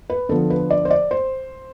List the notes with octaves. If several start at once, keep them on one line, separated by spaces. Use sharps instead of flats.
B4
D3 F3 B3 A4
B4
D5
C5
D5
C5